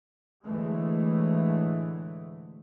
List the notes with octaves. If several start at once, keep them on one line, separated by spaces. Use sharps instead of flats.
D2 A2 D3 E3 G#3 A3